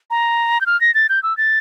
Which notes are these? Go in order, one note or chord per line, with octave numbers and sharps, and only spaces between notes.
A#5
G6
F6
A#6
A6
G6
E6
A6